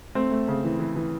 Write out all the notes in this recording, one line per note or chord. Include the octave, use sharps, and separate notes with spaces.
A3 C4
A3
C#3
E3
E3
E3